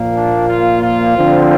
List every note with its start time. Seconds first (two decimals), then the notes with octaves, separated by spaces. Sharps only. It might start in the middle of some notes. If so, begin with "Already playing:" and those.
Already playing: A#2 F3 A#3
0.15 D4
0.49 F4
0.82 F4
1.15 D3 F3 C4